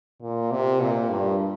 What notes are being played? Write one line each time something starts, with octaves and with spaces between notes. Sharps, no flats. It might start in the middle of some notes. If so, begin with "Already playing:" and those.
A#2
C3
A#2
G2